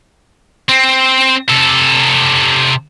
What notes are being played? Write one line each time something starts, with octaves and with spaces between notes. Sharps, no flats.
C4
C3 A4